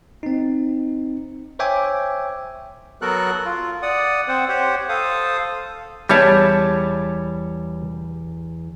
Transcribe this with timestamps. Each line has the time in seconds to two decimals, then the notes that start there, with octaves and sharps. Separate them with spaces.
0.23 C4 D#4
1.59 C5 C#5 E5 G5 G#5 D6
3.02 F#3 B3 F#4 A4 A#4 F#6
3.45 F4
3.82 D5 F#5 D#6
4.28 C4 C5 F#5
4.49 G4 C5 C#5 F#5
4.89 A4 C5 F5 D#6
6.09 E2 G3 C#5 E5 A5